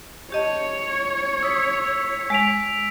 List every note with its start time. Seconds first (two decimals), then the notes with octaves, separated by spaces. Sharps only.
0.32 G4 C#5 D#5 A5
1.43 D#6 E6 B6
2.30 G#3 B6 D7 F7